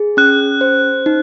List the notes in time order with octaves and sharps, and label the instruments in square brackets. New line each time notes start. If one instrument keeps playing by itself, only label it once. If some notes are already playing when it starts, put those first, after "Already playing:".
Already playing: [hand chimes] G#4
[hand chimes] C#4 [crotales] F#6
[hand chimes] C5
D#4